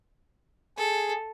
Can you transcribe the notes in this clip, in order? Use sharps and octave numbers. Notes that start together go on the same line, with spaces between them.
G#4 A4